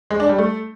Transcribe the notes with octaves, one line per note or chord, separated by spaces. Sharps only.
G#3
D4
G3
A3